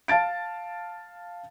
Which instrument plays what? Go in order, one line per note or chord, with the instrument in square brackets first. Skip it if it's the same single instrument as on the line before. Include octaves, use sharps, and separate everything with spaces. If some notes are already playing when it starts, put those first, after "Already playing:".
[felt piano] F5 A5 A6 D7